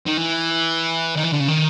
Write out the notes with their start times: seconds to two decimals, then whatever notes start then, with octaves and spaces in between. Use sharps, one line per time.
0.07 D#3
0.17 E3
1.16 D#3
1.24 E3
1.32 D3
1.40 C#3
1.48 D#3